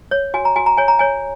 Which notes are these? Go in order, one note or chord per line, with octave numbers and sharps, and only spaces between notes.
C#5
F#4 G#5
A#5
F#4 G#5
A#5
C#5 G#5
A#5
C#5 G#5